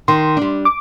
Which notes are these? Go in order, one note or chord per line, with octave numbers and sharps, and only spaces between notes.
D#3 C6
G3 D4
D6